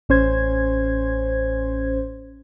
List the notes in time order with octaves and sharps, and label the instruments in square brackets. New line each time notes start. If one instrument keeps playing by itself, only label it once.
[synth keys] A1 C#4 C5 G#6